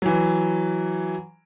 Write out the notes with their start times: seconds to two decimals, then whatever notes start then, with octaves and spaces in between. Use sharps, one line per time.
0.02 E3 F#3